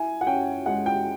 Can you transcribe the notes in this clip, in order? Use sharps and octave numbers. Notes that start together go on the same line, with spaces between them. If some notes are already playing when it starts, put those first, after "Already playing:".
Already playing: E4 G#5
F#5
C#4 G5
G#3 F#5
G5